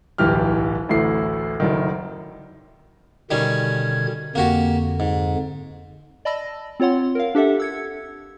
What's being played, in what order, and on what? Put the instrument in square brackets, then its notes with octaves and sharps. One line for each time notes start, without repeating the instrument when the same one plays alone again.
[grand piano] D1 B1 E3 G4 F6
A1 D2 A3 E4 C7
F#1 F#2 D3 D#3
[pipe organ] B2 D3 G#6 [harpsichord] D#3 G3 C#4
[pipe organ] F2 D3 [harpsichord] A#3 F#4 G4
[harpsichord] G#2
[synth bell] D5 D#5 A5 B5 E6 A#6
C4 F4 C#5 F#5 C6
A#4 F5
D4 G4 A4 E5 F#5
E6 G#6 C#7